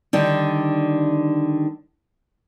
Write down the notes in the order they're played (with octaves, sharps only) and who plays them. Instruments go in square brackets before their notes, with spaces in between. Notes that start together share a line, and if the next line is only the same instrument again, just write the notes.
[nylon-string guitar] D3 D#3 G3